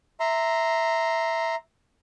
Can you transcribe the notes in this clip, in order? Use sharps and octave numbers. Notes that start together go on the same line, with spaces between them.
E5 A#5 C6